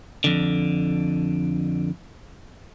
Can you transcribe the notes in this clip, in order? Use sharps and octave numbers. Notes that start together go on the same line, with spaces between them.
F2 D3